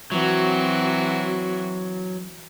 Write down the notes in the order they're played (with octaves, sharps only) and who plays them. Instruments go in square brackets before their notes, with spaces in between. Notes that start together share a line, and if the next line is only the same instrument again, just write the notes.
[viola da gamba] E3 C4 F#4 [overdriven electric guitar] F#3